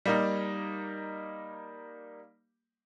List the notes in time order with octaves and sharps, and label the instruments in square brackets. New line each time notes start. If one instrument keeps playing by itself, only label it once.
[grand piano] G3 A#3 D#4